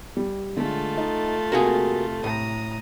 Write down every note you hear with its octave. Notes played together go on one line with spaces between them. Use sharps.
G3
D3 G#3 A3 F4
D#4
C3 A#3 F#4 G#4
A2 A#5 D#6